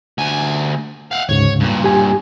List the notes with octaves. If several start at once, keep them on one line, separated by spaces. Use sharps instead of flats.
D2 G#5
F5 F#5
D2 G#2 C#3 C#5
G2 A#2
G4 G#5